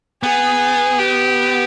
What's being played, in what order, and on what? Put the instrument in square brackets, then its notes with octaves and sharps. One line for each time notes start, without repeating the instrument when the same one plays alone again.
[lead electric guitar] B3 [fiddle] G#4
[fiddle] G4